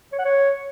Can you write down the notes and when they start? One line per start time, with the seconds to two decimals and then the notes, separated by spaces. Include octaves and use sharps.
0.13 C#5
0.19 F#5
0.25 C#5